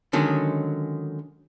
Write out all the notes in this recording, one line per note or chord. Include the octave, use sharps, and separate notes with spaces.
D3 D#3 F#3 G#3 C#4